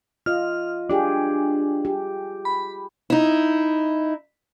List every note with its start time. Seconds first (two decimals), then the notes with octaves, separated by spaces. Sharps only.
0.26 F4 D#5 F6
0.90 D4 F4 G4 G#4
1.85 G4
2.45 B5
3.10 D#4 E4